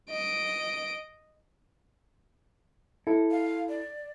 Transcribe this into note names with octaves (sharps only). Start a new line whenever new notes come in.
D#5 D7
E4 A4
F5
D5